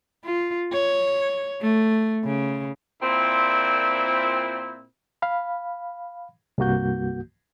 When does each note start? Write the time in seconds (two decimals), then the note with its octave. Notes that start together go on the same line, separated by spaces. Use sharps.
0.24 F4
0.73 C#5
1.62 A3
2.24 C#3
3.02 A#2 C4 E4
5.22 F5 B5
6.58 C2 G2 A#3 F#4 G6